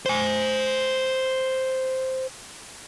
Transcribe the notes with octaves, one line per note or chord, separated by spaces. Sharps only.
C5 G#5